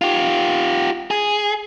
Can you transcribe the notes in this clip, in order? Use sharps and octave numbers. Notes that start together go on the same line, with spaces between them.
F4 G4
G#4